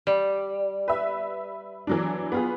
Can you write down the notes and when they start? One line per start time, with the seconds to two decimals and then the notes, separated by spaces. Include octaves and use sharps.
0.07 G3
0.88 B4 E5
1.87 E3 F#3 D4
2.32 B3 F4 G#4